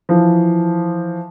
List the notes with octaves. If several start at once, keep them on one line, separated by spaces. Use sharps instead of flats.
E3 F3